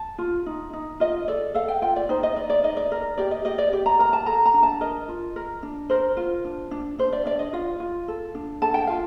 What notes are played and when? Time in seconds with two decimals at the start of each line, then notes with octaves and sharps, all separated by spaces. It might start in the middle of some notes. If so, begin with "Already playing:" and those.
Already playing: A5
0.18 F4
0.46 D#4
0.73 D#4
1.00 F4 D#5
1.28 A4 D5
1.54 A4 F5
1.68 G5
1.82 F4 G5
1.96 D5
2.09 D#4 C5
2.23 D#5
2.36 D#4 D5
2.50 D5
2.64 D#4 D#5
2.77 D5
2.92 A#4
3.18 G4 D5
3.31 D#5
3.45 G4 D#5
3.58 D5
3.72 G4 D5
3.86 A#5
3.99 A#4 A#5
4.13 A5
4.26 A4 A#5
4.45 A#5
4.54 D4
4.63 A5
4.81 A#4 D#5
5.09 F4
5.36 A#4
5.63 D4
5.90 A#4 C5
6.17 F4
6.45 D4
6.71 D4
6.99 D4 C5
7.13 D5
7.25 D4 D5
7.39 D#5
7.53 F4 F5
7.80 F4
8.08 A4
8.35 D4
8.62 A4 A5
8.74 G5
8.87 F4 F5